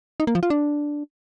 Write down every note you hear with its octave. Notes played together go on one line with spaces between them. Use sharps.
D#4
A#3
F3
F4
D4